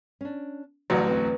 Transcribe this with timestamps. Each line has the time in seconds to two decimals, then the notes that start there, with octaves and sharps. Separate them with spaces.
0.21 C#4 D4
0.90 A1 D2 E3 F#3 D5
1.07 E2 C4 B4